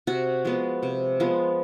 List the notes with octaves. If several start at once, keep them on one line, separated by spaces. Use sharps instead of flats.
C3 F#4
F3 G#3 B3
C3
F3 G#3 B3